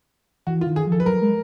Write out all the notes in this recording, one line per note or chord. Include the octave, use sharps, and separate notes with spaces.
E3 F#4
F4
D#3
G#4
F3
A4
B4
F#3 A#4
G#3